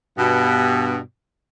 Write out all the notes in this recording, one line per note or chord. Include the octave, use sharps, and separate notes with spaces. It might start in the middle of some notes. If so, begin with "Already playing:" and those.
G2 B2